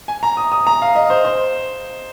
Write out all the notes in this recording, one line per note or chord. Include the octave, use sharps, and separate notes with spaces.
G#5
A#5
D#6
D#6
A#5
F5
D#5
C5
C5